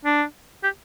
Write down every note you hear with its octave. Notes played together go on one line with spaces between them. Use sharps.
D4
G4